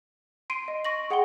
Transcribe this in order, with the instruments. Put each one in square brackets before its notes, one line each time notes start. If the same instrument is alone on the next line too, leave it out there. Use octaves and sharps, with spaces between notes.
[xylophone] C6 C7 D7 D#7
D#5
C#6 A#6 F#7
G#4 F#5 G5 C6 G7